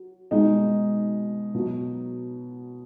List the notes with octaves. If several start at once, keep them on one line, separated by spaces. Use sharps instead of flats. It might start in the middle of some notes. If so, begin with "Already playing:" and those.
Already playing: F#3
B2 G#3 D#4
B2 F#3